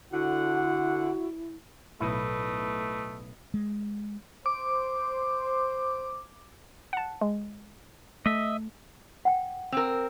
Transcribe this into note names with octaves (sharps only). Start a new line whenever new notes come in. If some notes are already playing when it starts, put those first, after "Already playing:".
D3 E4 F#4 F#5
B1 A2 A3 E4 B4 D#5
G#3
C5 D6
F#5 A5
G#3
A3 D#5 E5
F#5 G5
C4 A#4